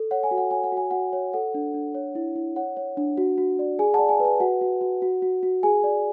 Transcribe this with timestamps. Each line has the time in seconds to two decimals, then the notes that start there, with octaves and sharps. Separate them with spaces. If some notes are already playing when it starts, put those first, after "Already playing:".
Already playing: A4
0.11 C#5 F#5
0.23 G#5
0.31 F#4
0.38 F#5
0.51 C#5 G#5
0.64 F#5
0.72 F#4 G#5
0.91 F#4 F#5
1.13 C#5
1.33 A4 F#5
1.54 D4
1.74 D4
1.95 C#5
2.15 E4
2.36 E4
2.56 C#5 F#5
2.77 C#5
2.97 D4
3.18 F#4
3.38 F#4
3.59 D5
3.79 G#4 G#5
3.94 D5 F#5 A5
4.09 G#5
4.20 B4
4.25 G#5
4.40 F#4 F#5
4.61 F#4
4.81 F#4
5.02 F#4
5.22 F#4
5.43 F#4
5.63 G#4 G#5
5.84 D5